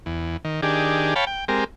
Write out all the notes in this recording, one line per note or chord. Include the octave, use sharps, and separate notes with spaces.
E2
D#3
D#3 D4 G4 G#4
C#5 F5 G5 A5 B5
G5
G#3 C4 G4 A#4